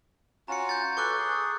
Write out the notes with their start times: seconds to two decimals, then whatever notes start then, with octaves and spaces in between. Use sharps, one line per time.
0.48 C#4 F4 F#4 A#5 C#7
0.69 G6 A6
0.97 A4 B4 C#6 D6 F#6
1.18 G#4